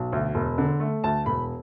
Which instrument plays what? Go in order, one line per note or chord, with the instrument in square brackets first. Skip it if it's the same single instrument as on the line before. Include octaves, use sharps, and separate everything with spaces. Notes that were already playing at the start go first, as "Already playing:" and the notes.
Already playing: [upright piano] B1
D2
E1
D3
A3
D2 A5
E1 B5